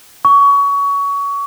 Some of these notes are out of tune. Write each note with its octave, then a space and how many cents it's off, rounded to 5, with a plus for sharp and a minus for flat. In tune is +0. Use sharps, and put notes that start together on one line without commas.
C#6 +25